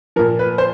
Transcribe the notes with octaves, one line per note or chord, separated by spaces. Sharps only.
A#2 F3 A#4
B4
C5